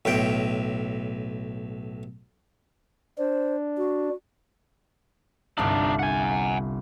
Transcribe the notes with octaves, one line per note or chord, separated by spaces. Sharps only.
B1 A2 G5
D4 C5
F#4
G1 C2 D4 D#4 F5
F#5 G#5